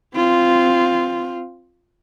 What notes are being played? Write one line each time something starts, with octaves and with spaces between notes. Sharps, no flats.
C4 F4